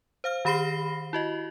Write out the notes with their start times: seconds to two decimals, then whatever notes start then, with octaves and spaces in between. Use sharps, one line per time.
0.24 C5 F5 F6
0.45 D#3 G4 B5 A#6 C7 G7
1.13 E4 F#4 D#5